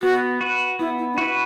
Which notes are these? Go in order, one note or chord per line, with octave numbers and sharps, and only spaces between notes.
B3 F#4
F#4 B4
B3 E4
E4
D4
E4 F#4 B4